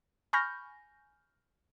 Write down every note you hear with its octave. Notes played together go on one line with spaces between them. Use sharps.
G#5 B5 C#6 F6 G6 A#6